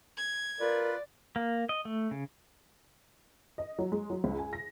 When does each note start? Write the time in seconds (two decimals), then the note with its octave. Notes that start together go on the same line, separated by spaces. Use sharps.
0.17 G#6
0.60 F4 A#4 B4 D5
1.36 A#3
1.69 D#5
1.85 A3
2.11 C#3
3.58 D#5
3.79 F#3
3.92 G#3
4.10 F#3
4.24 C#2
4.38 G#5
4.53 A#6